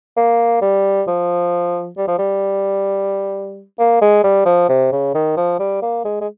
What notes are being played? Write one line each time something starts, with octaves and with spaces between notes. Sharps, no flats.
A#3
G3
F3
G3
F3
G3
A#3
G#3
G3
F3
C3
C#3
D#3
F3
G3
A#3
G#3
G#3